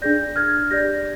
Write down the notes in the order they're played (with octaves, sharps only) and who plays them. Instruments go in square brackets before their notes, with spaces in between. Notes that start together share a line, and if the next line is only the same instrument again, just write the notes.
[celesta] D4 G#4 D5 G6 A#6
F6 G#6
G4 D5 G6 A#6